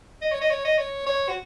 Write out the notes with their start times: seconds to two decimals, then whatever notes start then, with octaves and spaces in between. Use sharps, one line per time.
0.22 D#5
0.32 C#5
0.41 D#5
0.50 C#5
0.65 D#5
0.78 C#5
1.06 C#5
1.29 F#4